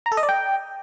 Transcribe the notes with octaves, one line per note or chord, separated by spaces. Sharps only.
A#5
A4
D#5
D5
G5